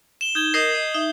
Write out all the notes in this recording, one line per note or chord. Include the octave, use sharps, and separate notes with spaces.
E7 G7
D#4 G6 G#6 G7
A#4 D#5 D#6 G6 C7
D#5
D#4 E5